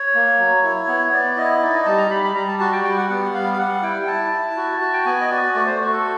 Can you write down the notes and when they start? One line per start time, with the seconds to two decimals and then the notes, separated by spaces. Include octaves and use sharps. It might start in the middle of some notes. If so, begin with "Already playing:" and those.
Already playing: C#5
0.15 A#3
0.38 F#3
0.64 E4
0.88 B3
1.12 B3 D5
1.37 E4 D#5
1.62 D#4 D5
1.74 D#5
1.86 G3 A5
1.98 A#5
2.10 G3 B5
2.24 B5
2.35 G3 A#5
2.48 A5
2.59 F#4 A5
2.73 G5
2.84 G3 G5
2.97 F#5
3.10 B3 F#5
3.34 G3 F5
3.53 F5
3.58 G3 F#5
3.82 E4 G5
4.07 E4 A5
4.32 E4
4.57 F#4
4.81 F#4
4.94 G5
5.06 B3 G#5
5.21 D#5
5.31 F#4 D5
5.55 A3 D5
5.67 C5
5.80 F#4
5.92 A4